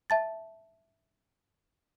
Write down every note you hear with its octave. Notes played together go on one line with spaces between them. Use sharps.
E5 A5 A6